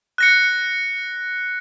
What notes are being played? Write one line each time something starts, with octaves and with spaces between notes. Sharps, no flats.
F#6 A#6 C#7